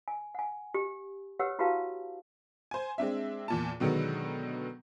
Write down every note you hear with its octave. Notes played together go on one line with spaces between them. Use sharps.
G#5
F#5 G#5
G4
G4 B4 C#5 F#5 E6
E4 F#4 G4 B4 F5 A5
C5 G#5
G#3 C4 D4 E5
E2 A#2 A5
B2 D3 D#3 F#3 G#3 B3